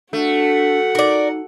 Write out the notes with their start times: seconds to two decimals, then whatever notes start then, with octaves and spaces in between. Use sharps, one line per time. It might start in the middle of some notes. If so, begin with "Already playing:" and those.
0.13 A3 D4 F#4 F#5
0.95 D#4 A#4 D5